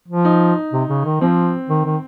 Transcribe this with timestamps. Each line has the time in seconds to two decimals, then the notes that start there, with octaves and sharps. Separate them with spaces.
0.08 F3
0.25 D#4
0.73 C3
0.89 C#3
1.05 D#3
1.21 F3 C4
1.70 D#3
1.85 D#3